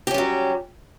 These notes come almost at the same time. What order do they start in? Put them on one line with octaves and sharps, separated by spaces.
G4 C#4 G3 F#3